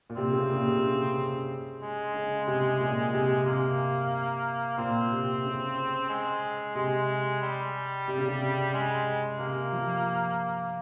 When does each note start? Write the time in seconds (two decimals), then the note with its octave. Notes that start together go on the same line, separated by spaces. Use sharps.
0.10 A#2
0.16 C3 C4
0.33 C#3
0.49 A#2
0.66 C3
0.83 C#3
1.81 G#3
2.14 C#3
2.47 C3
2.80 A#2
3.13 C3
3.46 C3 A#3
4.77 A#2 C4
5.11 C3
5.44 C#3
6.09 G#3
6.75 C3 G#3
7.42 G3
8.08 C3
8.18 C#3
8.28 C3
8.74 G#3
9.39 C3 A#3
9.73 F3